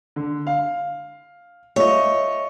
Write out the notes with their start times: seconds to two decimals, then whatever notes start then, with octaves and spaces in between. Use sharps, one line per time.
0.16 D3
0.47 F5
1.76 A3 F4 C#5 D#5